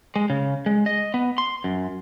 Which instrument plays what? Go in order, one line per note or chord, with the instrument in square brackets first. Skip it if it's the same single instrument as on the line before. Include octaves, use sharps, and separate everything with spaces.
[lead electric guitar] G#3
C#3
G#3
D#5
B3
C6
F#2